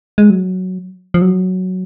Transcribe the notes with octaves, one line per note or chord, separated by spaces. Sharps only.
G#3
F#3
F3
F#3